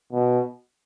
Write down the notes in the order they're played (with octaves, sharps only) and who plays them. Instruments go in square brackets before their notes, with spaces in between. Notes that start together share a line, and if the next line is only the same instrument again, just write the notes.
[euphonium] B2